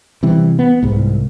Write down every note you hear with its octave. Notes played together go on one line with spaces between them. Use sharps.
C3 E3 G3
B3
C2 G#2